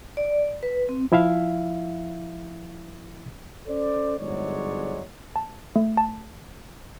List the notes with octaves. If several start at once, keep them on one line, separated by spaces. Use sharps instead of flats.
D5
B4
C4
F3 E4 E5 F5
C#4 A4 C5 D5
G1 G#2 F#3 G#3 C#5 D5
A5
A3
A5